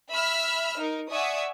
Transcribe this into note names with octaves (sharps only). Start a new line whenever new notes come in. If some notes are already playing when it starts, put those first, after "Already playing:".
E5 B5 E6 F6 B6
D#4 A#4
D5 E5 F#5 G#5 C#6 D#6